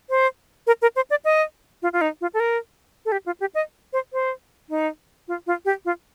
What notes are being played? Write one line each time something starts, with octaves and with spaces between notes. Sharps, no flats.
C5
A#4
A#4
C5
D5
D#5
F4
F4
D#4
F4
A4
A#4
A4
G4
F4
G4
D#5
C5
C5
D#4
F4
F4
G4
F4